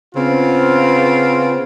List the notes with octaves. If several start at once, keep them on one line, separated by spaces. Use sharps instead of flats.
C#3 B3 C4 F4